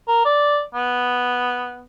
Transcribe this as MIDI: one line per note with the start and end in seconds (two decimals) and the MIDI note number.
0.08 0.24 70
0.25 0.61 74
0.75 1.83 59